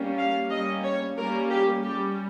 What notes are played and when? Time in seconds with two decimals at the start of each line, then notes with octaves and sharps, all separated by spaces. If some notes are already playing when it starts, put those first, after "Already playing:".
Already playing: G3 A#3 C#4
0.17 F5
0.50 G3 A#3 C#4 D#5
0.84 C#5
1.17 G3 A#3 C#4 A#4
1.50 G4
1.83 G3 C#4 G4